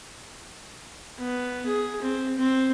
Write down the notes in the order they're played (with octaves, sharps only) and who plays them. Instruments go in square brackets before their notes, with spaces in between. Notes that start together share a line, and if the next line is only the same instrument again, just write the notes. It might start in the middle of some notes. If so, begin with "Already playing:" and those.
[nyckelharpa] B3
G#4
C4
C4